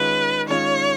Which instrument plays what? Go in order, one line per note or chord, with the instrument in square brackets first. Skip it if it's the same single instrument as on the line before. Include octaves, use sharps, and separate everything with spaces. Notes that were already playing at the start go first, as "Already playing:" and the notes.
Already playing: [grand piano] D#3 G#3 C#4 F4 [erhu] B4
[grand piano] D#3 G#3 C#4 F4 [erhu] C#5